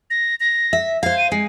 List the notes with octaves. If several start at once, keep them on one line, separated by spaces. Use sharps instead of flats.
A#6
A#6
E5
C5 F5 G#6
D#7
G#3 C7